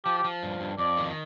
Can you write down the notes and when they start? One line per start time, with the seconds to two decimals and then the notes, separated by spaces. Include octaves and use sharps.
0.05 F3 G4
0.18 G4
0.24 F3
0.43 G2
0.60 G2
0.78 F2 D5
0.97 D#3